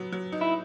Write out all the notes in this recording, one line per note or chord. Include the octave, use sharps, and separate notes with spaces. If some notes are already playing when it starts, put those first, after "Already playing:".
Already playing: F#3 B3
F#3
D#4
E4